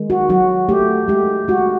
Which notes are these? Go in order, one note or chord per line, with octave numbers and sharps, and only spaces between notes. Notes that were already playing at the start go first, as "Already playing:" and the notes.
Already playing: D#3 G#3
F#4
F#3 F#4
A3 G4
G#3 G4
G#3 F#4